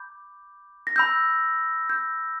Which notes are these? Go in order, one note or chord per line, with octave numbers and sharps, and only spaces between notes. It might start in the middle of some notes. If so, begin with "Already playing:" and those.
Already playing: B5 D6 G6
A#6
B5 E6 G6
G6